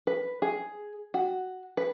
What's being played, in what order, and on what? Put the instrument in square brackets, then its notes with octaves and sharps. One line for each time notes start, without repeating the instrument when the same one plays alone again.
[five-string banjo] B4
G#4
F#4
B4